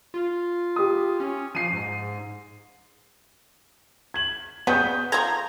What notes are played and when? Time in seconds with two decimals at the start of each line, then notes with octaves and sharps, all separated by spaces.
0.14 F4
0.76 G4 D#6
1.20 C#4
1.55 F3 C7 D#7
1.73 G#2
4.14 G#6 F#7
4.67 C#3 G3 B3 C#6 D#6 G6
5.12 F3 A4 A#5 G#6